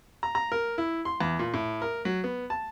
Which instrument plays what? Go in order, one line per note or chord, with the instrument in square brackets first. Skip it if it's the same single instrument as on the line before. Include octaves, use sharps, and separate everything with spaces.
[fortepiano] A#5
A#5
A#4
E4
C6
E2
A#2
A2
A#4
F#3
B3
A5